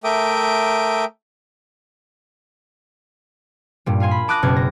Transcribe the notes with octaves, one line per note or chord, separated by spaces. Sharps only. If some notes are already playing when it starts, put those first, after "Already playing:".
A3 A#4 E5 G5 D6 D#6
G2 A#2 G3
F4 F5 G#5 C6
B5
A5 D6 D#6 F#6 A6 A#6
F#1 B2 D6 F6 G#6
A#6